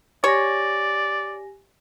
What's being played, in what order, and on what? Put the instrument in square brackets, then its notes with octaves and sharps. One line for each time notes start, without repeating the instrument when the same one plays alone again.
[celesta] G4 G#5 A#6 [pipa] C#5 [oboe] D5